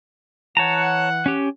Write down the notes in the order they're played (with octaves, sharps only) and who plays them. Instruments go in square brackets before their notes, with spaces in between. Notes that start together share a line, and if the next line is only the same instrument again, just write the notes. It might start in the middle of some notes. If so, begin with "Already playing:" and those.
[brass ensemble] E3 F#5 [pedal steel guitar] C#5 A5 A#5
[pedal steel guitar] C#4 G4